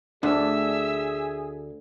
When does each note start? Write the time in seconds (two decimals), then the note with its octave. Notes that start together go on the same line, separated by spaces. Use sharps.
0.23 D2 D4 G#4 D5 E5 E6